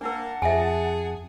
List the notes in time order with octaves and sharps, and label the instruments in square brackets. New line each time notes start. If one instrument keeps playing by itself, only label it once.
[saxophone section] A#3 [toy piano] D4 A#4 [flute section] F#5 A5
[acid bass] F2 [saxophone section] G#4 [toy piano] E5 G#5